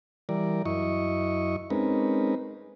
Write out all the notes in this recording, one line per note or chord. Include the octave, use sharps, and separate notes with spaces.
E3 G3 A#4 D5
F#2 E4 D#5 C#6
G#3 C4 C#4 D#4 A#4 B4